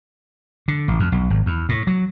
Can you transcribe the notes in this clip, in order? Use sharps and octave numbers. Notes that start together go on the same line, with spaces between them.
D3
A1
F2
B1
G#1
E2
A2
F#3